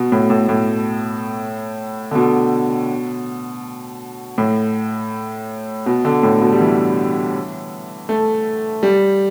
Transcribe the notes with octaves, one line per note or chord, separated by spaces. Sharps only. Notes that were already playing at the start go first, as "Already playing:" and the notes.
Already playing: B2
A2
A2
A2
D3
B2
A2
B2
D3
A2
B2
G3
E3
A3
G3